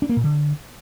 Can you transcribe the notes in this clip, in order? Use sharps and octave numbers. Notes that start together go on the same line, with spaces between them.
D4
A#3
A#2
D3